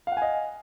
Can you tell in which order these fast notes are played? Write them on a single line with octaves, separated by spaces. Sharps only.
F5 F#5 G#5 D#5